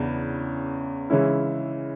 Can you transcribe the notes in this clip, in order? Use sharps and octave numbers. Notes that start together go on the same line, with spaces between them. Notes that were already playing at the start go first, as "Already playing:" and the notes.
Already playing: E2 C#3 E3 B3 D4
C#3 E3 G#3 C#4 E4